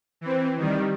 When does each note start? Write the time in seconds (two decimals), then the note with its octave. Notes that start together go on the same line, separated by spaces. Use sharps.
0.21 E3 C4
0.58 D#3 G3